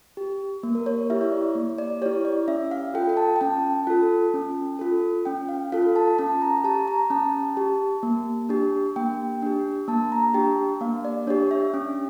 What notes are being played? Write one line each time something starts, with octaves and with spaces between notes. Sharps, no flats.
G4
A#3
A#4
C#5
E4 G4 E5
C#5
D5
A#3
D5
E4 G4 C#5
D5
C#4 E5
F5
F4 A4 G5
G5
A5
G5
C#4 A5
F4 A4
C#4
F4 A4
C#4 G5
F5
F4 A4 F5
A5
C#4 A5
A#5
G4 A5
A#5
C#4 A5
G4
A#3
D4 G4
A#3 G5
D4 G4
A#3 A5
A#5
D4 G4 G5
A#3 F5
D5
D4 G4 C#5
E5
C#4